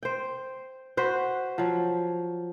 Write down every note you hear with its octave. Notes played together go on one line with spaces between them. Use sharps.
C5 G5
F#4 B4 C5 F#5
F3 F#3